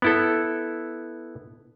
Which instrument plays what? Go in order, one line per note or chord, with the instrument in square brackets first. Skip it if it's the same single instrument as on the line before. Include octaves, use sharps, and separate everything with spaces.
[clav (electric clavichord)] B3 E4 A4